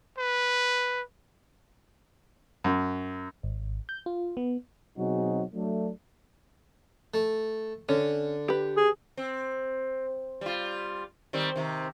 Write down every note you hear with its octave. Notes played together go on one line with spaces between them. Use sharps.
B4
F#2
G#1
G6
F4
B3
B2 F#3 C4 D#4 F#4 G#4
F#3 A3 D4
A3
D3 C#4
G4 B4
G#4
C4
G3 F4
D#3 G3 C4
C3 D#3